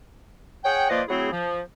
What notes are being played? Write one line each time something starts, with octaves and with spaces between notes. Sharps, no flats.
G#4 C#5 F#5 G5
F3 A#3 F4 B4 D5 D#5
F#3 A3 C4 E4 G#4
F3